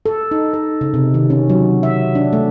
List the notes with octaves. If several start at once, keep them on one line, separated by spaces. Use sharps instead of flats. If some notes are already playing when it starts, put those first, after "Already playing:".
A4
D#4
A4
C#3
C3
D#3
C#4
F#3
E5
D4
A3